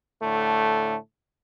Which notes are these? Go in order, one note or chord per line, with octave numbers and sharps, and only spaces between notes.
A2 D3 A3